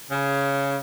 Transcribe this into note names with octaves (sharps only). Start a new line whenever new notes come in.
C#3